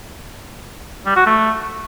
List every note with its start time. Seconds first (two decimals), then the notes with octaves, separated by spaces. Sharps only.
1.06 G3
1.16 F#4
1.26 A3